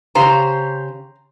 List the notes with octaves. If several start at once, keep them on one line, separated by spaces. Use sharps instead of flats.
C#3 G4 C5 A#5 C6